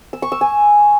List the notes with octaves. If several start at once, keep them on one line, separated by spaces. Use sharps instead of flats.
E6
C#6
E6
G#5